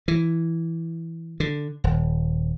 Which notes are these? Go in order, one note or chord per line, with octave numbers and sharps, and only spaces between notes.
E3
D3
D#1